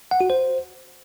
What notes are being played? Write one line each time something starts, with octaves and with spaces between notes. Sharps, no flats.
F#5
F#4
C5